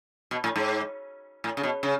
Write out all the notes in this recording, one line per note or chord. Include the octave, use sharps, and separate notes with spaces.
B2
A2
G#2
A2
C#3
B2
C#3